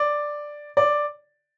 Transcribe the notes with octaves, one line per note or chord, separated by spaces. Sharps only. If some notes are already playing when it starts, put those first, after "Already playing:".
Already playing: D5
D5